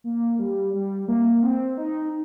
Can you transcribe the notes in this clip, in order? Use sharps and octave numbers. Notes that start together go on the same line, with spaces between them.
A#3
G3
G3
A#3
C4
D#4